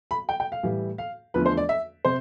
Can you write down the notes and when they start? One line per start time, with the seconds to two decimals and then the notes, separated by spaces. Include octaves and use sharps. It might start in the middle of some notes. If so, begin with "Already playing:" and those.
0.11 B5
0.29 G5
0.40 G5
0.52 F5
0.63 A2 E3 G3
0.98 F5
1.34 E2 D3 F3 A3 B4
1.46 C5
1.57 D5
1.69 E5
2.05 C3 C5